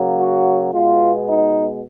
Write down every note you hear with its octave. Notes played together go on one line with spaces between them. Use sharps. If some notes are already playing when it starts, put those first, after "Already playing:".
Already playing: C#3 F#3 A#3
F#4
B2 G#3 B3 F4
D#4